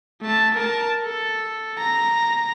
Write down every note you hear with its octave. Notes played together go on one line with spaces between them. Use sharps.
A3 A5
A#4 A5
A4
A#5